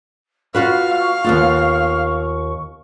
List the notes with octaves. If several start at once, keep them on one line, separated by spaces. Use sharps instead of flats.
F4 F#4 B4 F5 C#6
D#2 B3 F4